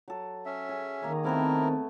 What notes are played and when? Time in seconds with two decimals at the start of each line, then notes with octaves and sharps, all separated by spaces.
0.08 F#3 A4
0.46 C#4 E5
0.69 G#4
1.02 D#3 A#3 C#5 A#5
1.24 A3 B3 C4 E4 A4 A#4